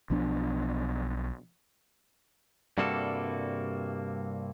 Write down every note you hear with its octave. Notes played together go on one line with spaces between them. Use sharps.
B1 F3 B3 D4
G2 C3 G3 A#3 F#4 A4